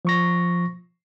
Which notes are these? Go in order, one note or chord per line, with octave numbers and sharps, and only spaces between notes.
F3 C#6 A#6